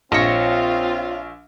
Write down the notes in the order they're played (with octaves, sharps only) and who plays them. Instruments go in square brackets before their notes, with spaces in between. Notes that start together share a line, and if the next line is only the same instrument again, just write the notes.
[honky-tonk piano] A#1 [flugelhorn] C4 [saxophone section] F4 [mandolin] C#5 D#5